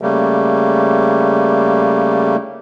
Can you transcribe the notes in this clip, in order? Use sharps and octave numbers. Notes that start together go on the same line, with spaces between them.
C#3 G3 A3 A#3